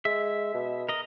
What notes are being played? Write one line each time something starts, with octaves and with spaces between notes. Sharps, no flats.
G#3 E5
B2
A#4 D#5